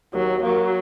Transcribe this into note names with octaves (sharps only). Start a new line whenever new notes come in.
D#2 F#3
F#3 A#3